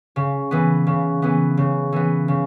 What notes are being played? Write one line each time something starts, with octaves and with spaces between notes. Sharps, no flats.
C#3
E3 B3
C#3
E3 B3
C#3
E3 B3
C#3